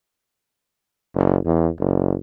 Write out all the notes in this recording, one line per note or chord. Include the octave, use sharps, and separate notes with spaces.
F#1
E2
F#1